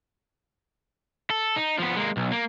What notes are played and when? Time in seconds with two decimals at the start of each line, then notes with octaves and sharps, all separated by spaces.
1.30 A4
1.56 D#4
1.79 F3 B3
1.97 G#3 A#3
2.17 B1
2.32 A#3